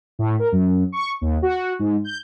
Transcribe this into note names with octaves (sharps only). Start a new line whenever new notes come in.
A2
A#4
F#2
C#6
D#2
F#4
G#2
G6